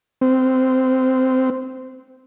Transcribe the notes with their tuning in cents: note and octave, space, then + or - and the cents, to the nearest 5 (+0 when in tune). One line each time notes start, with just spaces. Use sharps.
C4 -15